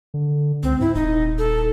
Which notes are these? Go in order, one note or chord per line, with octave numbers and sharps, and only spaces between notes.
D3
C#2 C4
G#2 E4
D#1 D#4
A4